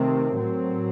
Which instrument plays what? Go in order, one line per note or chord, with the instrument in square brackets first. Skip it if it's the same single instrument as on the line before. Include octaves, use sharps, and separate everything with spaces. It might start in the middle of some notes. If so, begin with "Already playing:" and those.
Already playing: [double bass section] C3 D#3 A3 C4 [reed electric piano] A#4
[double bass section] A2 F#3 C4